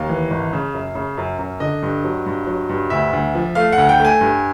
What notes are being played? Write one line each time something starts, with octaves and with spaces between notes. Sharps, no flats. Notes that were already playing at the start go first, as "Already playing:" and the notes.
Already playing: D#2 F5
E3
G#1
C#3
F#2
C#3
F#2
F#2
D3 D#5
G2
F#3
G2
F#3
G2
D2 E5
D2
F3
A3 F5
F#5
D2
G5
A3 G#5
G2